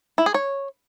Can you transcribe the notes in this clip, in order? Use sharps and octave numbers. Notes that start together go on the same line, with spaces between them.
E4
G#4
C#5